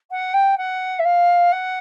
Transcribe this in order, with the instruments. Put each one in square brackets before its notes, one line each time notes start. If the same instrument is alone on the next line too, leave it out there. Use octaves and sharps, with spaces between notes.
[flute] F#5
G5
F#5
E5
F5
F#5